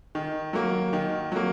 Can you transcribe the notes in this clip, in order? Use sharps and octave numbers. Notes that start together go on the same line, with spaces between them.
D#3
F#3 A#3
D#3
F#3 A#3